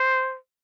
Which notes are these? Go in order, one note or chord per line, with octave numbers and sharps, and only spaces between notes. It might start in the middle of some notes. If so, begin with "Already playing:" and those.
Already playing: C5